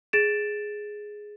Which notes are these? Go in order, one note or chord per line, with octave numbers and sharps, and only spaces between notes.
G#4 A6 D7 E7